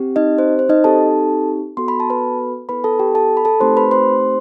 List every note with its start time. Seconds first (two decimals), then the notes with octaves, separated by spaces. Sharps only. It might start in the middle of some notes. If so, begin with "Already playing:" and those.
Already playing: C4 G4
0.16 D#4 D#5
0.38 C5
0.59 C5
0.69 D#4 D#5
0.84 C4 D#4 G4 A4 A5
1.77 B3 F#4 A4 C6
1.88 B5
2.00 A5
2.10 B4 B5
2.69 B3 E4 A4 B4 B5
2.84 A4 A5
2.99 G4 G5
3.15 A4 A5
3.37 B5
3.45 A4 A5
3.60 A3 C4 D#4 G4 C5 C6
3.77 B4 B5
3.91 C5 C6